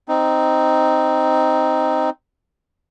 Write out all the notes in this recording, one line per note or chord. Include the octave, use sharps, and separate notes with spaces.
C4 D#4